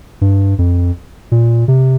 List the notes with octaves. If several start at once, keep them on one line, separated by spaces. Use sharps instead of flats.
G2
F2
A#2
C3